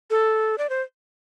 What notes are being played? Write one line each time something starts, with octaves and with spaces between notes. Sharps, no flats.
A4
D5
C5